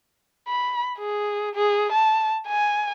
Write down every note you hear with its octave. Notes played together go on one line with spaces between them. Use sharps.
B5
G#4
G#4
A5
G#5